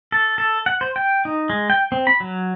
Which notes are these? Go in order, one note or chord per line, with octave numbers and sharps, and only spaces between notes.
A4
A4
F#5
C5
G5
D#4
G#3
G5
C4
B5
F#3